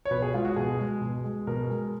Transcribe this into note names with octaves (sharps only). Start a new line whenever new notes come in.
C#5
B2 B4
G#4
G#3 F4
F#4
B2 G#4
G#3
B2
G#3
B2 A#4
G#3